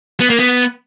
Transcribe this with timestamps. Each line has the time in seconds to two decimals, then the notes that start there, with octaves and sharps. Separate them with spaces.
0.20 B3
0.30 A#3
0.39 B3